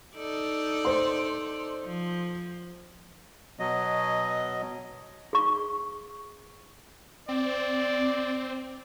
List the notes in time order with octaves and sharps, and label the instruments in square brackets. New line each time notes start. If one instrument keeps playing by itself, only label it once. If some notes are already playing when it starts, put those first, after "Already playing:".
[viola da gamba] D#4 A4 D5
[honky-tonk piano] C5 C6
[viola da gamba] F3
[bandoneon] B2 F#3 D#5
[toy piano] G#4 C#6
[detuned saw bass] C4 [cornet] D5